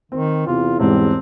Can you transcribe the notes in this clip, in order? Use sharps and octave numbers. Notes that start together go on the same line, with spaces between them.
D#3 C4
E2 C3 F4
E1 G#2 G3 C4